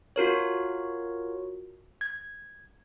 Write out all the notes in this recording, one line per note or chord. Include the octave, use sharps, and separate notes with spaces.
F4 F#4 A#4 C#5
G#6